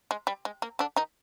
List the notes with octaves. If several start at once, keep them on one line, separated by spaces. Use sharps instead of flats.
G#3
G3
G#3
A#3
D3 D4
D#3 D#4